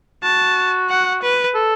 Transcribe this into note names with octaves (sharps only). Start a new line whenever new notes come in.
F#4 A5
F#5
B4
A4